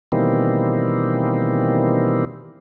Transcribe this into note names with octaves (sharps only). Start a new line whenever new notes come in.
B2 D#3 E3 G3 A#3 C4